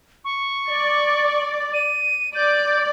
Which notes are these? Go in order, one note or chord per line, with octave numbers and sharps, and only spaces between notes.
C#6
D5
D#7
D5 G6